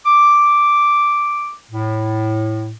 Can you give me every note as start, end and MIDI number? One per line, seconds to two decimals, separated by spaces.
0.06 1.54 86
1.71 2.73 45